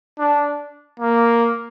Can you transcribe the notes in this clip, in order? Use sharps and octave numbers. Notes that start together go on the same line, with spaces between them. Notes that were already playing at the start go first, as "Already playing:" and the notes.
D4
A#3